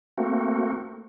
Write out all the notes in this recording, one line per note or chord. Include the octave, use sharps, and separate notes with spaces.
A3 A#3 C4 F#4